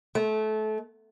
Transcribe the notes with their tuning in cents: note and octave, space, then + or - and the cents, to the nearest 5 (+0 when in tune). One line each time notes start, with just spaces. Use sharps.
A3 -25